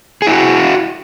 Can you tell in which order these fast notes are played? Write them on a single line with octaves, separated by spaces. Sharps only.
G#4 E4 F#4